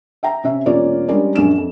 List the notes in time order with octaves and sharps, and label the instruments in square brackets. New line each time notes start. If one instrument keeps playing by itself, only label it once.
[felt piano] E5 G5 A#5
C3 C#4 E5
E1 A#3 C#4 F4 C#5 D5
G3 G#3 C#4 D4 A#4 D5
A#1 F#2 D4 E7
F2